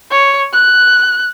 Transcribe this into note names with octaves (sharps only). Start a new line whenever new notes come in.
C#5
F#6